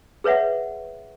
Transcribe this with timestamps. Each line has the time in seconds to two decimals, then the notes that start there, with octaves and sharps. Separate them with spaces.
0.24 G#4 B4 C#5 E5 F#5